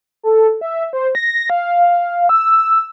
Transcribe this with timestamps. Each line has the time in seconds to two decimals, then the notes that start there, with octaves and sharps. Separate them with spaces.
0.23 A4
0.61 E5
0.93 C5
1.15 A#6
1.50 F5
2.29 E6